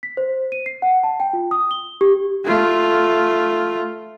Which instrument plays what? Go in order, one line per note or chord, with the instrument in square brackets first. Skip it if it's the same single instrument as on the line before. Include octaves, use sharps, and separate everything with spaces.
[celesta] B6
C5
D#7
C7
F#5
A5
G5
F4
D#6
G7
G4
[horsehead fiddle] A3 F4